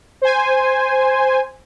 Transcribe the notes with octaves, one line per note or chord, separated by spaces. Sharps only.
C5 G#5